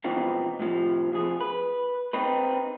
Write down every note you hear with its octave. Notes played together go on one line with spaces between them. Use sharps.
B2 E3 F3 C4 D#4
A2 C3 F3
F2 F3 G#4
B4
C4 D#4 B4